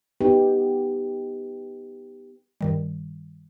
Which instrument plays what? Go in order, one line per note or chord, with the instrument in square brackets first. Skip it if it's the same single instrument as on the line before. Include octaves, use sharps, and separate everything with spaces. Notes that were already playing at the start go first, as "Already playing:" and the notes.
[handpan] B3 D#4 G4
[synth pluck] G2 D#3 G3